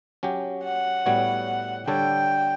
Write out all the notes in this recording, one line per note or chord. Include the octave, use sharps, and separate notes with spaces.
F#3 C#4 G4
F#5
A2 G3 B3 F#4 C#5
D3 G3 D4 A4 C#5 G5